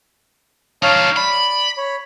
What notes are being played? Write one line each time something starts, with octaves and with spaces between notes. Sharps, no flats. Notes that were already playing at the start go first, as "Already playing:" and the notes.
G3 D#4 C#5 F5 A5
D5 B5
C#5 B5